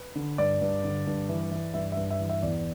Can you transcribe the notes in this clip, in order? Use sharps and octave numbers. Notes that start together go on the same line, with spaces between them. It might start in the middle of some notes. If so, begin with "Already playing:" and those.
Already playing: B4
D3
G2 D5
G2
D3
G2
E3
E3
G2 E5
E5
G2
E5
E3
E5
E2 D5